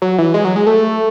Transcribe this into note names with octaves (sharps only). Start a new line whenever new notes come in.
F#3
E3
G#3
F#3
G#3
A3